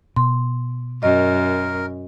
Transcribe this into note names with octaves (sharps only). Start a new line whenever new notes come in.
B2 C6
F#2 A#4 D#5